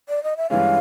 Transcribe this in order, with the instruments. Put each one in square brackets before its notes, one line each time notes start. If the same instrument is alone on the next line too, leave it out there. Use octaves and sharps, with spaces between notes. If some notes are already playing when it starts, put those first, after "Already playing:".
[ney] D5
D#5
E5
[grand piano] G2 E3 G#3 C#4 [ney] F5